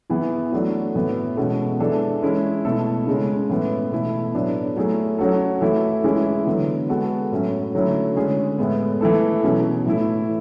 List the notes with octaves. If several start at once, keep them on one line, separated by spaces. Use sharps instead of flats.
E3 B3 E4 G#4
F#3 A3 D4 F#4
A2 E3 B3
B2 G#3 C#4 F#4 A4
E3 G#3 D4 A4
G#3 C#4 E4 G#4
B2 A3 E4 A4
C#3 G#3 C#4
A2 E3 B3
B2 A3 E4 A4
A2 F#3 B3 D4 A4
F#3 A3 E4 G#4
F#3 C#4 F#4 A4
E3 A3 E4 A4
E3 G#3 C#4 E4 G#4
D3 F#3 B3
G#3 B3 F#4 A4
A2 F#3 C#4
D3 F#3 A3 C#4 E4
D3 G#3 C#4 G#4
A2 G#3 B3
E3 A3 E4 A4
B2 F#3 C#4 G#4
A2 E3 A3 E4